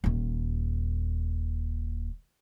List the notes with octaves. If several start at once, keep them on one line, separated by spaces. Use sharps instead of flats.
D#1 D#2